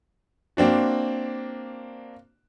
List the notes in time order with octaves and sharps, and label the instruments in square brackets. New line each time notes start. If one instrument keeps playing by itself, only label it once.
[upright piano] A#3 C4 D4 F#4